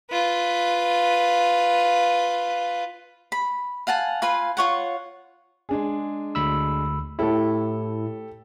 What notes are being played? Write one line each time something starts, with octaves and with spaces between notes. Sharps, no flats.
F4 B4
B5
F5 F#5 G#5 A5
F4 B4 F5 G#5
F4 C#5 F#5
G#3 D4 G#4
D2 B5 E6
A2 E4 G4 A4